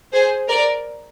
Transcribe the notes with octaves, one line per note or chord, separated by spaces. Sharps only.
G#4 C5
A#4 D5